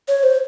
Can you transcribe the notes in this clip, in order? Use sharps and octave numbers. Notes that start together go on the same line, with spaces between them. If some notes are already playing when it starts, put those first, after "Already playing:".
C#5
C5